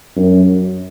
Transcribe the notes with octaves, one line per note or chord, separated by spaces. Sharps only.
F#2